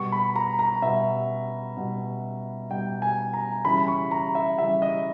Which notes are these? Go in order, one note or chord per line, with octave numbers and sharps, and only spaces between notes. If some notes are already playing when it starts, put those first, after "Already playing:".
Already playing: B2 G3 C#6
B5
A#5
A#5
B2 G3 E5
B2 G3
B2 G3 G5
G#5
A#5
C#3 E3 G3 B5
C#6
A#5
E5
C#3 E3 G3 E5
D#5